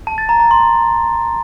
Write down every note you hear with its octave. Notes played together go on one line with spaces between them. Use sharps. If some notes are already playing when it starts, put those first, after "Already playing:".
A5
A6
A#5
A#5
C6